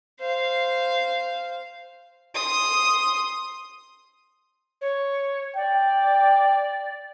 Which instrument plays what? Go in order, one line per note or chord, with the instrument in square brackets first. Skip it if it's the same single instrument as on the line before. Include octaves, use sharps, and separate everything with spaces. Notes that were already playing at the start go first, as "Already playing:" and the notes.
[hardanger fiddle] C5 F5
C6 D#6
[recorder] C#5
[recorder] D5 [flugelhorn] G5